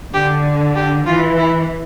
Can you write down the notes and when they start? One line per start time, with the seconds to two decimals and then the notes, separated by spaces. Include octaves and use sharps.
0.14 D3 G4
0.76 G4
1.06 E3 F4
1.38 E4